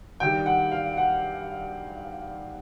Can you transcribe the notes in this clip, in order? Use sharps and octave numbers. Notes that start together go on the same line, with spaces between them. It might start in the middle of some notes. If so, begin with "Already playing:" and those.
G2 D#3 G3 G5
F#5
F5
F#5